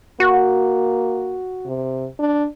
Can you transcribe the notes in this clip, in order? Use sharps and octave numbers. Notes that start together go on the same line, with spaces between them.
A#3 F#4
C3
D4